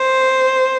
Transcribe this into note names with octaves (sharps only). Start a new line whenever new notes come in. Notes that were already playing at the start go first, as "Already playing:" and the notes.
Already playing: C5